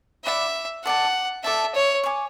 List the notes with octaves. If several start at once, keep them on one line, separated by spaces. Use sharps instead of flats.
D5 E5 F#5 B5 D6
A4 D5 F#5 A5
A4 D5 E5 A5
C#5
C#5 G#5 D6